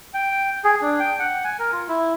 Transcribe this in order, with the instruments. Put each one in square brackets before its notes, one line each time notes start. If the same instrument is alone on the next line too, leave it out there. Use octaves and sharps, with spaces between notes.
[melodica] G5
G#4
D4
G5
F#5
G#5
A#4
F4
E4